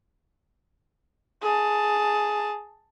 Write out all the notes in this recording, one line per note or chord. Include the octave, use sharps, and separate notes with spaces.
G#4 A5